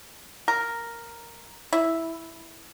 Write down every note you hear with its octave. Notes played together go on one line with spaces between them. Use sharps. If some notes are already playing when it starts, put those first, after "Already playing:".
A#4
E4